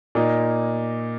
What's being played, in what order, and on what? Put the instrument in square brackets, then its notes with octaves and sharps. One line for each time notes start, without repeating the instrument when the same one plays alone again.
[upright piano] A#2 A#3 D#4